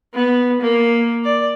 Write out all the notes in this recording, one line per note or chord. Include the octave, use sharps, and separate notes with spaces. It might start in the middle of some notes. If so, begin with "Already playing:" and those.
B3
A#3
D5